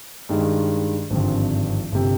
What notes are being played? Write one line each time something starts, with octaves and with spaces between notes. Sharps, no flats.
G2 D#3 G#3
G#1 G2 D3 F3 C4
G1 C3